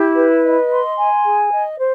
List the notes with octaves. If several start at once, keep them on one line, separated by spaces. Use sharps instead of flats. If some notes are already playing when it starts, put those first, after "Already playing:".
Already playing: E4 G4
B4
D#5
C6
G#5
G#4
D#5
C5